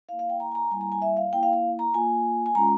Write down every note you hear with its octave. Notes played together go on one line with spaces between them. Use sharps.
A#3 E4 F5
F5
G5
A#5
G#5
A#5
G3 A#3 E4 G#5
A#5
G#5
E5
F5
A#3 E4 G5
F5
F5
A#5
A#3 F4 G#5
G#5
G#3 C#4 F4 A#5